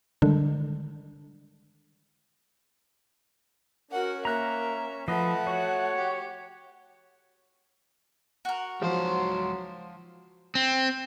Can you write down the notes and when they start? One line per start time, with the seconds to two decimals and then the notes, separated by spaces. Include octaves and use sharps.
0.22 D3 D#3 G3 G#3 D4
3.91 C#4 F#4 A#4 F#5
4.25 A#3 E5 A#5 F#6
5.08 F3 A3 B4 D#5 F#5
5.47 F#4 C#5
5.96 G4
8.45 F#4 A#4
8.82 C#2 F3 F#3 C5
10.55 C4